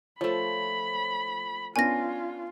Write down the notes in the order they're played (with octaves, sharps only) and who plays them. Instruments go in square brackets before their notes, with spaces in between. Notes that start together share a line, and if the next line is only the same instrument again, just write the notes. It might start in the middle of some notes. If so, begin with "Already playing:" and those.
[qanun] F3 A3 [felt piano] C#5 [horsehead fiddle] B5
[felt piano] B3 C#4 D4 [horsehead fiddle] F4 [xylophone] G#5 A#6